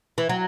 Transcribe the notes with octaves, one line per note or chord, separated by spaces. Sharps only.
E3
F#3